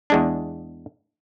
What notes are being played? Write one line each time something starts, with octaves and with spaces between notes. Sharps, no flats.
E2 G#3 D4